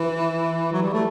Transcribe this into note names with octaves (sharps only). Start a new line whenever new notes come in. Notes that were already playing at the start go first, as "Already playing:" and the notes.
Already playing: E3
F#3
G3
A3